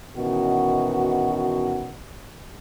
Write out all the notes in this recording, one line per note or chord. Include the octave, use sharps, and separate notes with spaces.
B2 D#3 E3 C#4 F#4